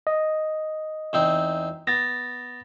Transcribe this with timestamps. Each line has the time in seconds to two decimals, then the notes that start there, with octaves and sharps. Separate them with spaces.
0.07 D#5
1.13 E2 C4 D#4
1.87 B3 A6 A#6